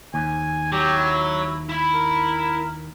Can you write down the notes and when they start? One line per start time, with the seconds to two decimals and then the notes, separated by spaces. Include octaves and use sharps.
0.14 D#2 G#5
0.72 F#3 G4
0.97 E4
1.69 E4 B5
1.94 A#4